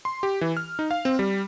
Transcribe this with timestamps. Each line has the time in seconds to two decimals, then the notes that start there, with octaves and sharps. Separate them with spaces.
0.05 C6
0.23 G4
0.41 E3
0.57 F6
0.79 D#4
0.91 F5
1.05 C4
1.19 G3